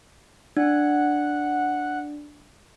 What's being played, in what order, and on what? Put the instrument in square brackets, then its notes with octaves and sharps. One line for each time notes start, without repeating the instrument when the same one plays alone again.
[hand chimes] D4 [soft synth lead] F#5